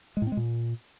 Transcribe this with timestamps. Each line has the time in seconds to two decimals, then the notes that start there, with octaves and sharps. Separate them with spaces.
0.17 G#3
0.22 A2
0.27 C4
0.32 G#3
0.37 A#2